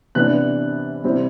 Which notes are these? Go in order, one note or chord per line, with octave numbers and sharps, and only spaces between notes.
C3 E3 B3 D4 F#6
C3 G3 C4 E4